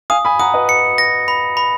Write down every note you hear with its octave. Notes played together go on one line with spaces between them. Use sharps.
F5 G#5 D#6
G#5 B5
F#5 A#5 D#6
B4 D#5
C#7
A#6
B5
B5